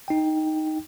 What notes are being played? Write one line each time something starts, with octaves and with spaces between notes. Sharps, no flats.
D#4 G5